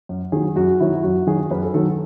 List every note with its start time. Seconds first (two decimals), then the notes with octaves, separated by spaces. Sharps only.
0.09 F#2
0.32 D#3 F#3 G#4
0.56 F#2 F#4
0.80 D#3 F#3 E4
1.03 F#2 F#4
1.27 D#3 F#3 G#4
1.51 F#2 B4
1.63 A4
1.74 D#3 F#3 A4